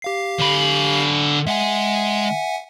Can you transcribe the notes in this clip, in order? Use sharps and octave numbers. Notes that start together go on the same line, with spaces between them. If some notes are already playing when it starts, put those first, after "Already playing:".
G4 F5 C7
D3 B5
G#3 E5 F#5 G#5